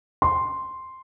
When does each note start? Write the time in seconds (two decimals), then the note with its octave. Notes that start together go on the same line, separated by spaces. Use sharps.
0.22 C6